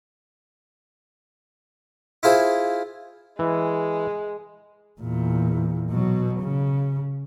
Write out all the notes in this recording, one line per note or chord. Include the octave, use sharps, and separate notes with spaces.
E4 F4 G#4 C5
E3 G#3
E2 A#2
B2 F#3
C#3